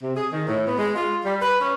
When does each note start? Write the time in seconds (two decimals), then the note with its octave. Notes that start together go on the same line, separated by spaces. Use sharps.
0.01 C3
0.16 G#4
0.31 D#3
0.48 A2
0.66 B3
0.77 G#3
0.96 F4
1.23 G3
1.41 B4
1.60 C#4